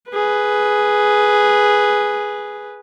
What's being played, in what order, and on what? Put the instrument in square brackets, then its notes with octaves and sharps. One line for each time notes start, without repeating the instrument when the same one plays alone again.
[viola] G#4 B4